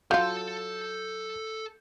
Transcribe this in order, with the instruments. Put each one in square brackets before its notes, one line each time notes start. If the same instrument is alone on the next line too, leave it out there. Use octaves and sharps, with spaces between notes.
[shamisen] F#3 F4 [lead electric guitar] A4 A5 [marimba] F5 [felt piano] G6